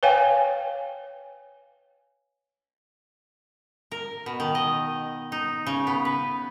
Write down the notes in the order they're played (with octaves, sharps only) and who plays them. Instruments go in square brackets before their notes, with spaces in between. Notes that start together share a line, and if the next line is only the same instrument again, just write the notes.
[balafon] B4 C#5 F5 G5 G#5
[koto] A#4
B2
D#3
D#5
D#4
C#3
B3
B4